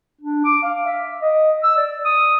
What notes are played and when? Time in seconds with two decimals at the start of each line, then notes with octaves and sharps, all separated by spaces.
0.21 D4
0.44 D6
0.63 F5
0.86 E5
1.22 D#5
1.63 E6
1.77 D5
2.04 D#6